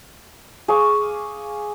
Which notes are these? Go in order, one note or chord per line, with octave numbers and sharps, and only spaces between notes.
G#4 F5 C#6 D6